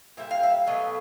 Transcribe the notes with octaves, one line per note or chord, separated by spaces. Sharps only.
A#2 G3 E5
F5
E5
B2 F#3 A3 D#5